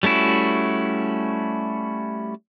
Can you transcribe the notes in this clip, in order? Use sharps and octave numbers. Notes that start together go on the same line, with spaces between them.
G3 A3 C#4 E4 F#4